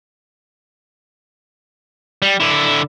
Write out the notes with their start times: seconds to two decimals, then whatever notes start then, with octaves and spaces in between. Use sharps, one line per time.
2.22 G3
2.40 D3 E4